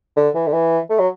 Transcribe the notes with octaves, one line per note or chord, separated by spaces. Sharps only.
D3
E3
D3
E3
A3
F#3